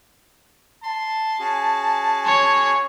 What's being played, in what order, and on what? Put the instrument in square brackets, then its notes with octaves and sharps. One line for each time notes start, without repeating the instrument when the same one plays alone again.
[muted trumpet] A5 [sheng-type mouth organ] C6
[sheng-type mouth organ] C#4 F#4 G#4
[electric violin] C#5